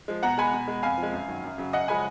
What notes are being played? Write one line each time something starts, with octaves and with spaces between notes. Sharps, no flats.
F3 G#3
B2 F#5 A#5
G#3 G#5 B5
B2
G#3
F2 F5 G#5
F3
G#3
F#2
D#3 F#3
F#2
C#3 F#3
F#2 D#5 F#5
C#3 F3 G#3 G#5 B5